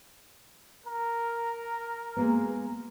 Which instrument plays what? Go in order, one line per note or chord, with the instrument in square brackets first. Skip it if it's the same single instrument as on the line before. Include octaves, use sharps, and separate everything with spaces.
[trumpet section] A#4
[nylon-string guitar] G#3 A#3 B3